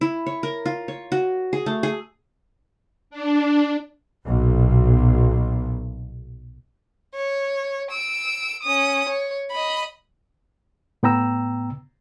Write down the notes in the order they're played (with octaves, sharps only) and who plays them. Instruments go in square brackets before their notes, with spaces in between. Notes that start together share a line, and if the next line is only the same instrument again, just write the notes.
[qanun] E4
C#5
A#4
F4
C#5
F#4
G#4
A3
G#4
[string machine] D4
[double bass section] B1 A#2
[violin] C#5
E6 D7
C#4 D#6
C#5
D#5 B5
[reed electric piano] A2 B3 G5 A#5 E6